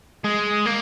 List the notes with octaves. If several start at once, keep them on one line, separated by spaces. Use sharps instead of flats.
G#3
A#3